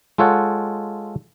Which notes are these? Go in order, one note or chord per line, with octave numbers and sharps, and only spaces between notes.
G#3 F4 A4 C#5 F#5